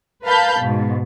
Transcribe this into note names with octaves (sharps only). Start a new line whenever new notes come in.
A#4 B4 F5 A5 B5 G6
G#2 B2